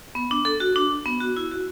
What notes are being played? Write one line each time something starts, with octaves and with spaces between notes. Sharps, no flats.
B3
D4
A4
F#4
D4
B3
F#4
E4
F#4